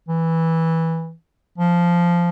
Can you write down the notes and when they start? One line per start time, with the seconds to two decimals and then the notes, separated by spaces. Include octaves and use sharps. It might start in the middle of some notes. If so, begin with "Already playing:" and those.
0.08 E3
1.58 F3